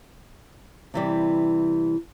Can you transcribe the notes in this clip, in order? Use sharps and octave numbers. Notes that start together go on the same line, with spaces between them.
C3 E3 G3